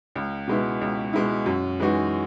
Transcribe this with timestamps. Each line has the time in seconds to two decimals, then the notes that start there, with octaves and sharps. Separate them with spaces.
0.16 C#2
0.48 B2 G#3 B3 E4
0.81 C#2
1.13 B2 G#3 B3 E4
1.46 F#2
1.80 E3 G#3 D#4 F#4